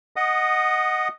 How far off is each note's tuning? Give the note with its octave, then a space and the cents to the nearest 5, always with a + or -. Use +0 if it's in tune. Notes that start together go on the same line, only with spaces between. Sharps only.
D#5 +0 F#5 +0 D#6 -20